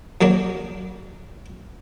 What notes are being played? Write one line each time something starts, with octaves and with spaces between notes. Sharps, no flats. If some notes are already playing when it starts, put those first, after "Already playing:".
F2 F#3 A#3 D4